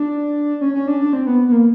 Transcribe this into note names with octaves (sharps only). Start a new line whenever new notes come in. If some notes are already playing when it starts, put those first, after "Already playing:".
Already playing: D4
C#4
C#4
D4
D4
C4
B3
B3
A#3